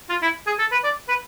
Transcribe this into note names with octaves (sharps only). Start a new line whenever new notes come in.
F4
E4
G#4
A4
B4
D5
B4